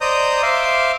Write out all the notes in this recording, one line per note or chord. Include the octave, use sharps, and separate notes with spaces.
C5 D5 D#5 A#5 D#6 G6
C5 E5 F5 C6 D6